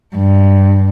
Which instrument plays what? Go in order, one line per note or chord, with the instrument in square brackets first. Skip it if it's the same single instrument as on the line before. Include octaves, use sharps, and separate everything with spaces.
[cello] G2